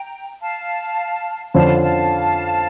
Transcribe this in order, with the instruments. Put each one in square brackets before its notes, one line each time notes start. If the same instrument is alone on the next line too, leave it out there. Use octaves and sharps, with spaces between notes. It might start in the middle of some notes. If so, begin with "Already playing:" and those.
Already playing: [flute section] G5 A#5
F5 A5
[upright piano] F2 D3 F3 C#4 [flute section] F5 A5
[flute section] F5 A5